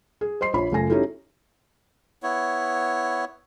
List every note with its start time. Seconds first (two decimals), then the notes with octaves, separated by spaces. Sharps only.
0.21 G#4
0.41 C5 D#5 C6 C7
0.53 A#1 F3 C#5 B5
0.72 F#1 A3 F4 G#5 A#6
0.90 C#4 D#4 E4 F#4 G4 A4
2.23 B3 E4 C#5